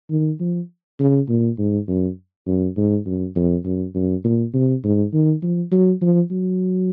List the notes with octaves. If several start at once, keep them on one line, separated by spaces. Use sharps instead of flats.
D#3
F3
C#3
A#2
G#2
F#2
F#2
G#2
F#2
F2
F#2
F#2
A#2
C3
G#2
D#3
F3
F#3
F3
F#3